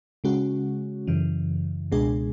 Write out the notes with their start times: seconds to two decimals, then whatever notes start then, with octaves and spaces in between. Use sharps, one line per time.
0.24 C#3 G#3 C#4 F#4
1.07 F#2 C#3 E3
1.92 C#2 B2 G#3 D4 G#4